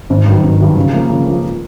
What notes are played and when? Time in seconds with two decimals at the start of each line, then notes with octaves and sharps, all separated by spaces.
0.10 G#1
0.26 G2 D#3 F#3
0.43 G#1
0.60 G2 D#3 F#3
0.77 C#3
0.93 F3 A#3
1.09 C#3
1.27 F3 A#3